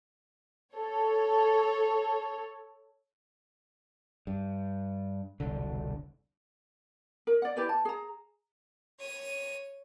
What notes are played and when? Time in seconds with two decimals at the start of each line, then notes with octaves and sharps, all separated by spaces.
0.75 A4 C#5
4.27 G2
5.40 E1 C2 D3
7.27 A#4
7.42 D5 F#5
7.56 E4 G4 B4 D5
7.69 A5
7.85 G#4 A#5
9.00 C#5 D#7